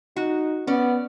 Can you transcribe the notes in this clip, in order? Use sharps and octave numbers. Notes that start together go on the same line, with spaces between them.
D#4 F#4
B3 C#4 D5